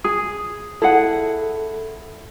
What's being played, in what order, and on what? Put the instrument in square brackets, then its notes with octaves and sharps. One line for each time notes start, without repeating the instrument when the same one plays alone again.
[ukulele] G#4 [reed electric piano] D#6
[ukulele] E4 G#4 F#5 [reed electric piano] A4